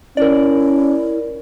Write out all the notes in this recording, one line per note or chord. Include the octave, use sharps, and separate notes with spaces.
C#4 E4 A#4 D5